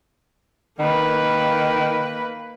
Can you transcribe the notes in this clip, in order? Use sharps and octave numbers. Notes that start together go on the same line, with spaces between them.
D#3 A#3 B4